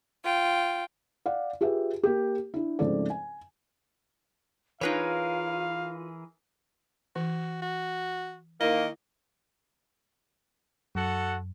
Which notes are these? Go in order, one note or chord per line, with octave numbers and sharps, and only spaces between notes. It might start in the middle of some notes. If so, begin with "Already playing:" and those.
F4 G5
D5 F5 F#5
F4 G4 G#4 B4 E5
A#3 G4
D4 E4
G#2 C#3 F3 A3 C4 D5
G#5
E3 D#4 F4 G#4 A#4 B4 C#5 F5
E3 F#4
F#4
D#3 A#3 E4 D#5
F#2 F#4 A4 F#5